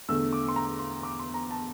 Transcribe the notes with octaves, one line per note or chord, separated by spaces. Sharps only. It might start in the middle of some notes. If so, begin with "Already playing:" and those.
E2 D3 A3 E6
D6
C6
A#5
C6
D6
C6
A#5
A5